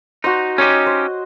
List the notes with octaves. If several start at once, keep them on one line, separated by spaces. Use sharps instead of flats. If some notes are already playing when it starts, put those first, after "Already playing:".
D#4 F#4 C5
C#4 D#4 G4 C#5 D#5
C5